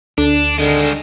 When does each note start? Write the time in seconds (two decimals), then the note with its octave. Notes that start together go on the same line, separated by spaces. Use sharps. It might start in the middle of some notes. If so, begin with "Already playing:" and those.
0.18 D2 D4
0.58 D3 D#3 G#3